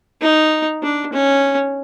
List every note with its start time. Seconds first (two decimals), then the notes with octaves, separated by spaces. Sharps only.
0.21 D#4
0.82 D4
1.13 C#4